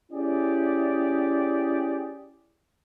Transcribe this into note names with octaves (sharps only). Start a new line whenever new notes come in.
C#4 E4 G4 G#4 D5